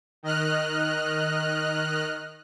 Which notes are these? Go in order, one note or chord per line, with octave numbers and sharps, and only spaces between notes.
D#3 D#5 F6 F#6